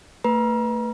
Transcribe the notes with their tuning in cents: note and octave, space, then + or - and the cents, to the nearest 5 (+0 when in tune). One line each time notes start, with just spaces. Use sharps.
A3 +40 B4 -5 A#5 +35